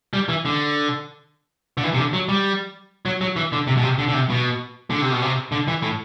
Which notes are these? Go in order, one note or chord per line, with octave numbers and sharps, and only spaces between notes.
G3
E3
D3
D3
E3
C3
D3
F#3
G3
F#3
F#3
E3
D3
C3
B2
C3
D3
D3
C3
B2
D3
C3
B2
C3
D3
E3
A2